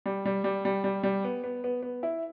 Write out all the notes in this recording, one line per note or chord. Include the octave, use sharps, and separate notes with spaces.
G3
G3
G3
G3
G3
G3
B3
B3
B3
B3
E4